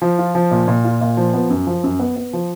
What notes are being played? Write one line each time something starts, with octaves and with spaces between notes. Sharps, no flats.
F3
F4
F3
A#2
A#2
F4
A#2
F3
B3
F#2
F3
F#2
B3
B3
F3